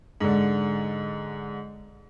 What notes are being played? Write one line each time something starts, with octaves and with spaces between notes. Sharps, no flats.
G#2 D3